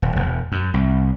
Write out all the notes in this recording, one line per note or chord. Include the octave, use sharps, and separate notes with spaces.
D#1
E1
F#2
C2